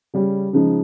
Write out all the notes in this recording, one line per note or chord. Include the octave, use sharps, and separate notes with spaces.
C#3 G3 C#4
C#3 F3 G#3 D#4